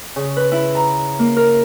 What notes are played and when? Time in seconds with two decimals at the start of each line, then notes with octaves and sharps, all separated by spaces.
0.16 C#3
0.37 B4
0.52 E4
0.75 A#5
1.19 A#3
1.37 A#4